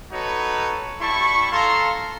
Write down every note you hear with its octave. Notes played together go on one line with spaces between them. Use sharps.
D#4 F#4 A4 B4 C#5
G3 E4 A5 C#6
A4 F5 A#5 C6